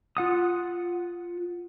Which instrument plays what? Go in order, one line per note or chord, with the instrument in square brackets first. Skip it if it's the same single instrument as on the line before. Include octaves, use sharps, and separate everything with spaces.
[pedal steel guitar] F4 F#5 D#6